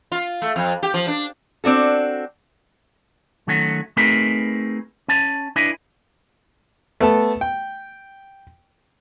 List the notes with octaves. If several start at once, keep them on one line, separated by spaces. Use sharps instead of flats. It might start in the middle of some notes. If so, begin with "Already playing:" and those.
F4
A3
F2
G4
F3
D4
C4 D4 F#4 A4
D#3 F#3 A3 C#4 F#4
A3 C4 D#4 G#4 A#4 B4
C#4 G#5 A5
D4 E4 B4 D#5 G#5
A3 B3 A4
G5